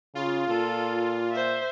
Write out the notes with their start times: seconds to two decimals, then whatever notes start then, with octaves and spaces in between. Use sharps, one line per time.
0.15 C#3 F4
0.48 A#2 A4
1.31 C5 E5